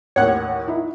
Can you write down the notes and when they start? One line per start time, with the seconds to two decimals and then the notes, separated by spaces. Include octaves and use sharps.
0.16 A1 D#2 C#5 F#5
0.67 D#4 E4